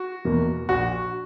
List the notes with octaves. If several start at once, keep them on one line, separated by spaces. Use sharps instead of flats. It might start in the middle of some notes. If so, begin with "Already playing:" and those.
Already playing: F#4
E2 B2 A#3
A#1 F#4